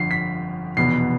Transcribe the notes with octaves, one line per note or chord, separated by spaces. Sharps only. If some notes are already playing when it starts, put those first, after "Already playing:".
Already playing: G1 F2 D3 F3 C7
B6
F1 E2 B2 B3 C7